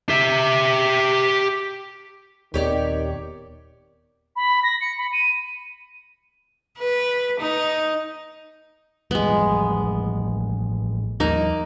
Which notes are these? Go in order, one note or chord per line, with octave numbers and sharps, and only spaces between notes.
G4 E5
D#1 D#3 B3 C4 G4 C#5 D5
B5
A#6
C#7
B5
D#7
B4
D#4
A1 F3 G3 G#3 B3
D#2 F3 G3 A#3 D#4